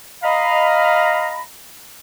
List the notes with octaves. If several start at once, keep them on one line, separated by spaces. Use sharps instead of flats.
D#5 F5 A#5 B5